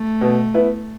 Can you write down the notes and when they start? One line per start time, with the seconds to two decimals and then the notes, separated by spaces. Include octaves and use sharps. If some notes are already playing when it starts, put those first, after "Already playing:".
Already playing: A3
0.21 B2
0.54 B3 E4 B4